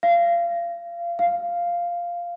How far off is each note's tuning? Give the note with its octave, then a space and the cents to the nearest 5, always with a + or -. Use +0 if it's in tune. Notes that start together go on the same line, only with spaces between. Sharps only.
F5 -30
F5 -5